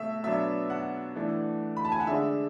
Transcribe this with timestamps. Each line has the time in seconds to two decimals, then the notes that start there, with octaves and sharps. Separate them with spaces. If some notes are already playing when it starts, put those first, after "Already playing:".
Already playing: B2 A3 E5
0.24 B2 F#3 B3 D4 E5
0.70 F#5
1.16 E3 A3 D4
1.77 B5
1.85 A5
1.92 G#5
2.00 F#5
2.07 D3 G#3 D4 E5